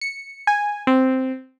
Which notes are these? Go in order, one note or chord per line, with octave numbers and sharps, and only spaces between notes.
C#7
G#5
C4